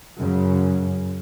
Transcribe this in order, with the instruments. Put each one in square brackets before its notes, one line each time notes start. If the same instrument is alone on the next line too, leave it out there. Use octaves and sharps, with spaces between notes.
[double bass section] F#2 C#3